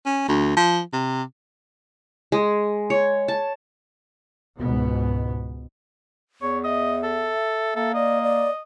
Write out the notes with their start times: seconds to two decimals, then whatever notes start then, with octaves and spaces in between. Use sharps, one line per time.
0.06 C#4
0.28 D2
0.56 F3
0.93 C3
2.32 G#3
2.90 C#5
3.28 A5
4.58 C#2 G#2 B2 B3
6.42 E2 C#5
6.64 D#5 E5
7.04 A4
7.76 A#3 A4
7.94 D5 D#5
8.23 D5